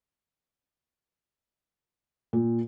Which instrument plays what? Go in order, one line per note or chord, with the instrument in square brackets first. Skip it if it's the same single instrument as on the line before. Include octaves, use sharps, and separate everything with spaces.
[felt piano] A#2